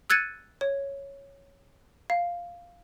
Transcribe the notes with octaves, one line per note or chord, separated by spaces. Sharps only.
E6 F#6 G#6 A6 C#7 D#7
C#5
F5